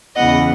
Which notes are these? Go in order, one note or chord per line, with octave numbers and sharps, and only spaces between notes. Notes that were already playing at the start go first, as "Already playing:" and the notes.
E2 C#3 E3 B3 D#5 F#5